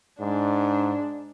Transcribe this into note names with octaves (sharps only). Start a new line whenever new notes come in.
G#2 D4